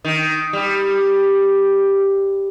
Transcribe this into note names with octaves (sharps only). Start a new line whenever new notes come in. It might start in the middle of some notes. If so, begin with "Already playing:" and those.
D#3
G3